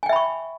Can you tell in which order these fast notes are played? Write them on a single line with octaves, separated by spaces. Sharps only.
G#5 G5 E5 B5 C#6